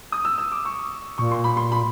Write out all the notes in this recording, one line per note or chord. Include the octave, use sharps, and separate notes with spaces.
D#6
E6
E6
D6
C#6
A#2 C#6
C6
B5
C6
B5